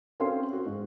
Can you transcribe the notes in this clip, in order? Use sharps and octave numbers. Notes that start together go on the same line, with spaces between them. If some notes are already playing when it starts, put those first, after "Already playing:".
C4 C#4 F#4 A4 F5 C6
F#4
G#2